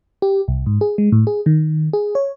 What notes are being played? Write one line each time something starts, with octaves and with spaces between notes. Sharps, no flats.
G4
C2
G#2
G#4
G#3
A2
G#4
D#3
G#4
C#5